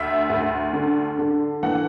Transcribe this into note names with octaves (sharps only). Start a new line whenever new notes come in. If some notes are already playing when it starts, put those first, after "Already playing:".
Already playing: D2 E5
D2
D3
D3
E3 F#5